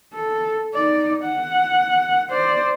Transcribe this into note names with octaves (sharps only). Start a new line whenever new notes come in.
A4
D#4 D5
F#5
C5 D5